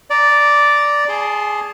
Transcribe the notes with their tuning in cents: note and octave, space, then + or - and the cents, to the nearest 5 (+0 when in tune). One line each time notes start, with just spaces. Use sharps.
D5 -5 A#5 +0
G#4 +0 A5 -30 C6 +0